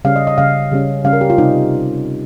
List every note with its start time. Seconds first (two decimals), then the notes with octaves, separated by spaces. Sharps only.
0.05 C#3 G3 C#4 F5
0.16 D#5
0.27 D#5
0.38 C#3 G3 C#4 F5
0.71 C#3 G3 C#4
1.04 C#3 G3 C#4 F5
1.13 A#4
1.21 G4
1.30 F4
1.38 C3 G3 C4 D#4